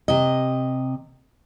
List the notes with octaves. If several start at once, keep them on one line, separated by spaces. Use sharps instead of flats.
C3 D#5